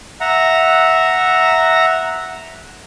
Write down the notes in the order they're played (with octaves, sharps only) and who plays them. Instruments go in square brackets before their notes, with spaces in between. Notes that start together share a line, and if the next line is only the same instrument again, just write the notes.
[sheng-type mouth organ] E5 F#5 A#5